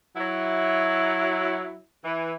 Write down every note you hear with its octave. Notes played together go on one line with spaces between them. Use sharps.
F#3 E4
E3